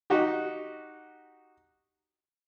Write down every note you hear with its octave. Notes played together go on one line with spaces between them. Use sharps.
D#4 F#4 G4